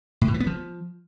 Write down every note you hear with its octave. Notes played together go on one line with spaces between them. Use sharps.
A2
B2
E3
B3
F3